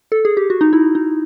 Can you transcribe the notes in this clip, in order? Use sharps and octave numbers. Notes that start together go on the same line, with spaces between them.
A4
G#4
G4
F#4
D#4
E4
D#4